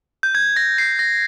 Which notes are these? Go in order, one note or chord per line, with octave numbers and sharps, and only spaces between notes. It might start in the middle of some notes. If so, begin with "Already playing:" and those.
G6
G#6
A#6
C7
A#6